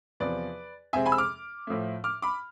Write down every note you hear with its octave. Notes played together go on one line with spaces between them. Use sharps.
E2 C3 F3 B4 D5
F2 C3 G#3 C4 E5 G#5
G#5 B5
E6
D6 F6
A2 F3 A3
D6 F6
B5 D6